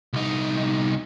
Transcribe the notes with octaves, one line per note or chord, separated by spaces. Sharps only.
C2 D#4